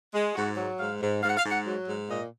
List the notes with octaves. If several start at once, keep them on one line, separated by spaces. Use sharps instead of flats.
G#3
G#2 F#4
F#3
G#2 F5
G#2
G#2 F5
F#5
F5
G#2
F#5
F#3
G#2
A#2 D#5